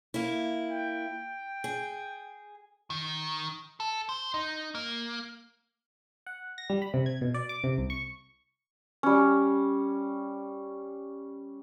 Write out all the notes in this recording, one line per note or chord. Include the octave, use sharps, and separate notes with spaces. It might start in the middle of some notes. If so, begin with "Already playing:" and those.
A#3 E4
G5
G#4
D#3
A4
C5
D#4
A#3
F#5
A#6
G3
B5
C3
G#6
B2
D5
D6
C3
C2
C#6
G3 C#4